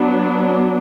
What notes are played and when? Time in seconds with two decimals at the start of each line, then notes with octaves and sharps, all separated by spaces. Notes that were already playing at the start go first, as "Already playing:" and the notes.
Already playing: F#3 B3 D4